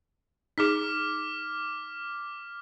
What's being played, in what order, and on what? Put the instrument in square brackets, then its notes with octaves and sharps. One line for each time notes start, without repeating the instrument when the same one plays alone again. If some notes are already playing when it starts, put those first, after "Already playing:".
[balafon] D#4 G#4 [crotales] D6 F6 B6